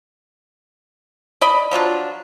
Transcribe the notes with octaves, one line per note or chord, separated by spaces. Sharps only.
D5 D#5 B5
F3 F#3 D4 F4